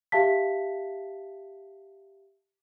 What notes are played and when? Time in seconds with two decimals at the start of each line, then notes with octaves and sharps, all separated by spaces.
0.12 G4 E5 F5 A5 B6